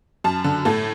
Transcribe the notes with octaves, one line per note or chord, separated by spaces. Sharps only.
F#2 A5
D3
A2 A4